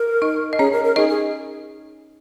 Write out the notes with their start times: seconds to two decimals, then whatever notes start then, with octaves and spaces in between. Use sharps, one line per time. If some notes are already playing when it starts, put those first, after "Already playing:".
Already playing: A#4
0.22 D#4 D#5
0.53 D#5
0.59 C#4 G#4 C#5
0.72 A#4
0.84 A#4
0.96 D#4 G#4 D#5
1.09 G#4